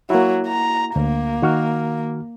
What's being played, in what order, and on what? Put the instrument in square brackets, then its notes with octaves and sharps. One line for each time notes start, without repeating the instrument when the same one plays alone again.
[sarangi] F#3 [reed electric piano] A#3 E4
[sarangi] A#5
[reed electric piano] D2 [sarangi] A#3
[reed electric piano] D#3 F#4 F6